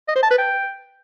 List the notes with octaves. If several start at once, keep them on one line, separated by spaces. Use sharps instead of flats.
D#5
C5
A5
B4
G5